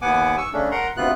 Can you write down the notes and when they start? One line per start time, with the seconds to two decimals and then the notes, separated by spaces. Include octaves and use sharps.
0.02 D#2 B3 F#5 G#5 D6
0.38 C#6 E6
0.53 C#3 A3 C#4 D4
0.71 A#4 F#5 A#5 C6
0.97 D2 C3 B3 F4 F#6